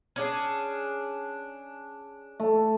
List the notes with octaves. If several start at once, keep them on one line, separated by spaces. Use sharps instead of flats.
C#4 D4 G#4
A3